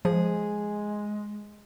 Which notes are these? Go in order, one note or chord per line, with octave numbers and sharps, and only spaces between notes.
F3 G#3 G#4